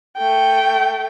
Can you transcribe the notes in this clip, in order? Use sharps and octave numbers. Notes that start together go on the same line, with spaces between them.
A3 G5